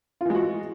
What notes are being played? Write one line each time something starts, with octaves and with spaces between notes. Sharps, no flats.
E3 G#3 F4 F#4